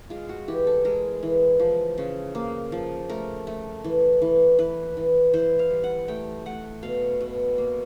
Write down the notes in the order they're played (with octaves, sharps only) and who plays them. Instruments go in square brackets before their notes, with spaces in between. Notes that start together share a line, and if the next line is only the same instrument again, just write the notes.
[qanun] G#3 F4
F#4
E3 G4
A4
G#3 A#4
E3
F3
C#3
A#3
F3
A3 A#4
A3
E3
E3
E3 B4
E3
E3 C5
F5
G3
F#5
A3 G5
A3 F#5
B2 F5
B2
A#3